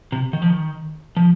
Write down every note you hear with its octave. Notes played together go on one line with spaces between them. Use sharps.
C3
D#3
F3
D#3
F3